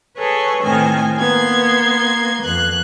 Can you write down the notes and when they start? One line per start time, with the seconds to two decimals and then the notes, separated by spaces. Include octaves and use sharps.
0.17 G#4 A4 B4 C#5
0.63 A2 D#3 C4 G#5
1.18 A#3 B3 C6 G#6
2.42 F2 F#6